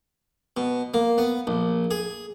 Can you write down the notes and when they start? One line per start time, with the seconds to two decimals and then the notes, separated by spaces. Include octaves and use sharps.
0.57 B2
0.94 A#3
1.18 B3
1.47 A#1
1.91 G#4